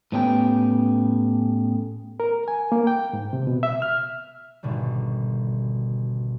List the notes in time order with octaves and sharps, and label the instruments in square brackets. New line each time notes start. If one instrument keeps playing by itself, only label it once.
[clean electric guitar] A2 B3 C#4 G4 A4 G5
[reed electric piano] A#4
G#5
A#3
G5
G#2
C3
B2
E5
F6
[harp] G#1 B2 D3 G3